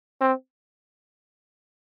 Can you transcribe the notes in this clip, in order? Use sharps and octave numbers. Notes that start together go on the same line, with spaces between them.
C4